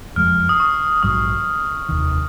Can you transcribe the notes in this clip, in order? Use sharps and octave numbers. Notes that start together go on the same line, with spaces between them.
F#1 F2 F3 G#3 F6
D#6
C#6
A#1 G#2 F#3 D#6
F1 D#2 D#3